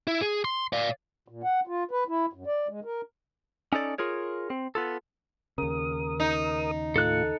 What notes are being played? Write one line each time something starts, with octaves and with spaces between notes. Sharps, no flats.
E4
G#4
C6
D5 F5
A#2
F#5
F4
B4
E4
F#2
D5
G#3
A#4
C#4 D#4 A4 D5
F4 G#4 A#4 C#5
C4
B3 F4 A4
D#2 C#3 A#4 D#6
D#4
A2 F4 A4 F#6